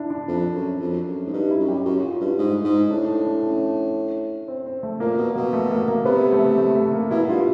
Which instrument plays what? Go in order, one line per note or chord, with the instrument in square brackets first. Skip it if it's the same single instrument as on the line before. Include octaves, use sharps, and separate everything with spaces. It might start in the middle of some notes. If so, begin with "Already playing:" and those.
Already playing: [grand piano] D4 E4
D4
[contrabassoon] F2
F#2
F2
F#2
G#2
[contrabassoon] G2 [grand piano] D#4
[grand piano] E4
[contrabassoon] F#2
[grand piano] G4
[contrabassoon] F#2 [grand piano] F#4
[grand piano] F4
[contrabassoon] G2 [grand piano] E4
[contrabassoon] G#2
[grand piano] D#4
[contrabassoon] G#2
[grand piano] D#4
[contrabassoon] A2 [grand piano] D4
[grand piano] D4
C#4
C4
C4
A3
[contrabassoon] A#2 [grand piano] A#3
[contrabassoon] B2
[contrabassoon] B2 [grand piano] A#3
[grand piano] A3
A#3
A#3
[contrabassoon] C3 [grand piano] B3
[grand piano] A3
A3
A3
A#3
[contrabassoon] B2 [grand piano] E4
[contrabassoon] G2 [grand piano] F4